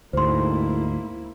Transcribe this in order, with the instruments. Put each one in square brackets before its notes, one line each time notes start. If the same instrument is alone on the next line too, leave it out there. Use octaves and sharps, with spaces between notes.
[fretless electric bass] D2 G#2 [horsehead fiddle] A#3 E4 [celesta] C5 C6